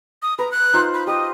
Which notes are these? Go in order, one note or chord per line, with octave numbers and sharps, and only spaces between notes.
D#6
B4 A#5
F#6
D#4 F4 C5
B5
G4 D#5